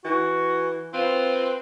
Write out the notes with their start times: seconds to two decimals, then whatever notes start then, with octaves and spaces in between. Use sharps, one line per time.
0.05 E3 F#4
0.94 C4 F4 B4